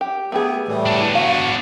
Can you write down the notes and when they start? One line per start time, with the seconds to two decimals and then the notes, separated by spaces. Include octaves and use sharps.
0.01 G4
0.32 A3 B3 G4 G#4
0.68 A2 E3 G3
0.86 B3 D4
1.15 F#4 F5